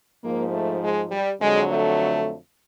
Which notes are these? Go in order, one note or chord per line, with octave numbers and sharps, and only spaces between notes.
G#2 F3 A#3
A3
G#3
G3
F2 D3 F#3 G#3
A3